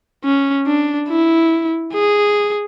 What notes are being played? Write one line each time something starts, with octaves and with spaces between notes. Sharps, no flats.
C#4
D4
E4
G#4